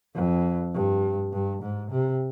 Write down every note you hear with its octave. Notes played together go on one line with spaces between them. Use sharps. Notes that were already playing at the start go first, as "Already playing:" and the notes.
F2
G2
G2
G#2
C3